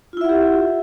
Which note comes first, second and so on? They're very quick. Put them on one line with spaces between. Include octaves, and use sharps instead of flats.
F4 E4 E5 F#5 G4